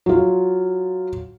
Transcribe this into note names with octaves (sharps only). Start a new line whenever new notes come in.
F#3 F4